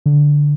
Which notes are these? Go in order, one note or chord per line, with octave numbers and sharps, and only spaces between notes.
D3